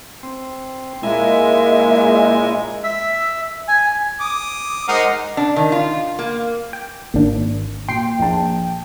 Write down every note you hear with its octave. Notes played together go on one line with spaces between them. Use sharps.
C4
A#2 G#3 A#3 E4 E5 G#5
E5
G#5
D6 D#6
G#3 D#4 A#4 C5 F#5 F6
D4
D#3
F4
A#3
G5
G#1 A#3 D4
A#2 G5 C6 C7
A#1 A5